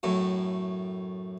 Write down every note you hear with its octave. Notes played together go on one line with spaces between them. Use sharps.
F#2 A2